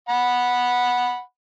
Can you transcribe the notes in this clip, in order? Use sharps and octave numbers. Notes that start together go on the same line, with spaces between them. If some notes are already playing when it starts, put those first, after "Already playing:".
F#5 B5